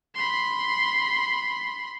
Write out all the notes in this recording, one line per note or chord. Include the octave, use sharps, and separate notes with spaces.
B5 C6